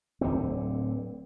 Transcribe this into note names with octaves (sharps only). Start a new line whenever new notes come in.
D1 G1 D3 C4